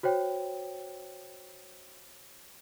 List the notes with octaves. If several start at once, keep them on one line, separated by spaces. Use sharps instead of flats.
F#4 C5 C#5 G5